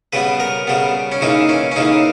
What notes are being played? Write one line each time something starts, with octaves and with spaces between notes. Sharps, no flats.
C#3 G3 B3 B4
A#4
C#3 G3 B3
C#4
C#3 E3 A#3 D#4
C#4
C#4
C#3 E3 A#3 D#4